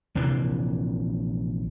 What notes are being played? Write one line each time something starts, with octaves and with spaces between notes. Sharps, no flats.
A#1 C3 E3 A#3